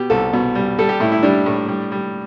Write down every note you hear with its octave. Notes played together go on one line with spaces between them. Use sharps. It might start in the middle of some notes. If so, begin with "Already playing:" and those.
Already playing: B2 G4
C2 A4
B2
G3
G3 A4
G4
A2 E4
E4
G3 D4
A2
G3
G3